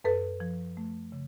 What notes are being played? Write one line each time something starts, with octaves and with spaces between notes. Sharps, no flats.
F#2 A4 B4
F3
A3
C#3